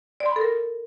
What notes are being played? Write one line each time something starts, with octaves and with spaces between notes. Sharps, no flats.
D5
C6
B5
A4
A#4